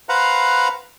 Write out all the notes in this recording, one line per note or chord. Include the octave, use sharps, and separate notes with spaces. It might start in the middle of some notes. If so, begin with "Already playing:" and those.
B4 C5 F5 F#5 A#5